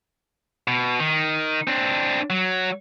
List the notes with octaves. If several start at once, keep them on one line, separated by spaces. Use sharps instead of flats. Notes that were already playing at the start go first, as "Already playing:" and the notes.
B2
D#3
C4 D4
F#3